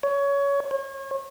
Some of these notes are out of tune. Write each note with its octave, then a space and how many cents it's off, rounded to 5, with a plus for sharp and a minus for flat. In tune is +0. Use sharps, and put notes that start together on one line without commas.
C#5 +20
C#5 -35